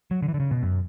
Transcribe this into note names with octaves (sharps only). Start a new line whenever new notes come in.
F#3
D3
E3
D3
C#3
B2
F#2